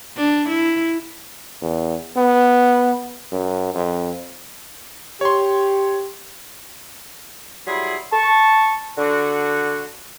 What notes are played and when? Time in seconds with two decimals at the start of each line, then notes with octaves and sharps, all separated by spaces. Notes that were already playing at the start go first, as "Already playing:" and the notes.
0.17 D4
0.48 E4
1.61 E2
2.17 B3
3.32 F#2
3.74 F2
5.21 G4 C#5 C6
7.67 F#3 G3 E4 G#4 B5 C6
8.12 A5 C#6
8.98 D3 F#4